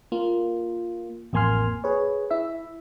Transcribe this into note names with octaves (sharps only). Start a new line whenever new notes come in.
A#3 F4
A1 F2 A#3 G#5 C6 F6
G#4 B4 C#5
E4 E5